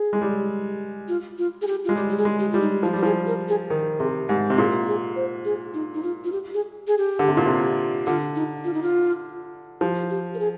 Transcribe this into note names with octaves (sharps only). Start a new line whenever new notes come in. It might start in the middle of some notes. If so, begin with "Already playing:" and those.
Already playing: G#4
G#3
G3
F4
F4
G#4
G4
G#3 F4
G3 G4
G4
G#4
G#3
G4
G3 F4
D#4
F3 F4
G3 G4
F3 G#4
A#4
G#4
D#3
C3 G#4
G#2 G4
C3
A#2 G#4
G#4
C5
G#4
D#4
D#4
F4
F4
G4
G#4
G#4
G4
D3
C3
A#2
C3
D3 F4
D#4
F4
D#4
F4
F3 G4
G4
A#4
G#4